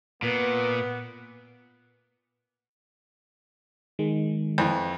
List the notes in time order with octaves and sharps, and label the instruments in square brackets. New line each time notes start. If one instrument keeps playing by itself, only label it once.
[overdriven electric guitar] A#2 [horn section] B3
[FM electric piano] D#3 G#3
[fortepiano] F2 E3